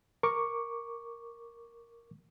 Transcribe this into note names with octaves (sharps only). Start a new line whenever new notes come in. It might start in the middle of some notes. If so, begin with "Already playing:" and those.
A#4 C#6 D6